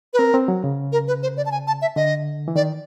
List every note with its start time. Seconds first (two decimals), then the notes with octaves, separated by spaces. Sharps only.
0.13 B4
0.18 C4 A#4
0.34 C4
0.48 F#3
0.64 C#3
0.92 A#4
1.08 B4
1.23 C5
1.37 D5
1.46 A5
1.52 G#5
1.67 A5
1.82 E5
1.96 D3 D#5
2.48 E3
2.56 D#3 D5